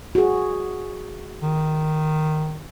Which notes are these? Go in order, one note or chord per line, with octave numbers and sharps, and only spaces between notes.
F#4 G#4
D#3